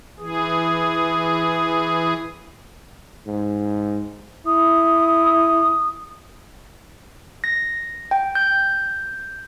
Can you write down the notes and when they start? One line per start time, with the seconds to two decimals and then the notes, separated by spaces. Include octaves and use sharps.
0.19 E3 G#4
3.27 G#2
4.46 E4 D#6
7.44 A#6
8.11 G5
8.35 G6